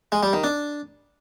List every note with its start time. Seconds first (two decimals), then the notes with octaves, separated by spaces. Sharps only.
0.12 G#3
0.23 G3
0.33 D#3
0.44 D4